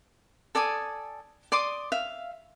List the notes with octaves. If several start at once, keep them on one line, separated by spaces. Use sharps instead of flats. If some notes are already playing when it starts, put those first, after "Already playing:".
A4 D5 G#5 D#6
D5 C6 D6 D#6
E5 F5